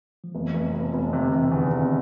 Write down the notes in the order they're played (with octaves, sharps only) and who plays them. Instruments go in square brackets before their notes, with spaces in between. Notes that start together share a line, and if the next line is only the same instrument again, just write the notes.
[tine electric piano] F3
[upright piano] F1 [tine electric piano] E3
[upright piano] F1
F1
F1
[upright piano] C3 [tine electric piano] D#3
[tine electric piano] D3
[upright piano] C3 [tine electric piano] E3
[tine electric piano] D#3
[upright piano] E2 [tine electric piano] D3
[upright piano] C3